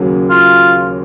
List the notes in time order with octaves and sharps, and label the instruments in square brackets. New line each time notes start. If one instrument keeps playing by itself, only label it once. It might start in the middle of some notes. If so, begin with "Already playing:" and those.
Already playing: [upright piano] D#2 C#3 F#3 A#3 C#4
[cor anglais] F4